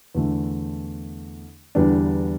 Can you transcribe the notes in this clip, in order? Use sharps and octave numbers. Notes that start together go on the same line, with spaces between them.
E2 D3 A3
E2 D3 G3 B3 D4